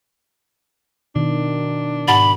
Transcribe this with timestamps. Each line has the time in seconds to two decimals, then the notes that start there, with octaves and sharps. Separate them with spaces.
1.16 B2 D#3 D4
2.08 G#2 F#5 B5 A6